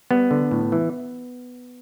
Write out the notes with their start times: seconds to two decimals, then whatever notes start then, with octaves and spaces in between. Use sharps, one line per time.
0.11 G3 B3
0.31 D3
0.51 A2
0.72 E3